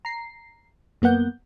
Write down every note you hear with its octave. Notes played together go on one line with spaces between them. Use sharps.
A#5 C7
F#2 A#3 B3 F#5 G6